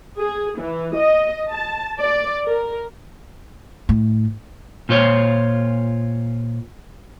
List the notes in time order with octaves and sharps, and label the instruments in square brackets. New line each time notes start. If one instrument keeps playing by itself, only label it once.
[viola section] G#4
E3
D#5
A5
D5
A#4
[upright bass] A2
[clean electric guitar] A#2 F4 C5 C#5